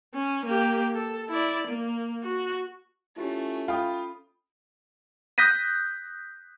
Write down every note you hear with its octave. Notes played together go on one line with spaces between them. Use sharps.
C#4
A#3 G4
A4
E4 D5
A#3
F#4
A3 C#4 E4 F4 G4
F4 G5 B5 D#6
D#6 F#6 G6 A#6 B6 D#7